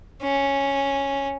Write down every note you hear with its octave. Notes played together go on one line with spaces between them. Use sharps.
C#4